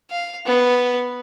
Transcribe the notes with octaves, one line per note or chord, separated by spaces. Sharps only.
F5
B3 B4